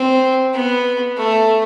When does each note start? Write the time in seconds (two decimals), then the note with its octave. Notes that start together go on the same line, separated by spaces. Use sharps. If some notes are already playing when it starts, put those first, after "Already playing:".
Already playing: C4
0.53 B3
1.18 A3